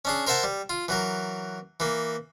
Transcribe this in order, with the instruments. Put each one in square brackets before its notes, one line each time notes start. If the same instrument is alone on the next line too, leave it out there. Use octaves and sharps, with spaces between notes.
[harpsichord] C#4 D4 G#4
A#4 C5 E5 F#5 A5 A#5
G3
F4
E3 F#3 A#4
E3 A#3